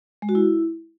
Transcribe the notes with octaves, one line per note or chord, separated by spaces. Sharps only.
G#3
F#4
E4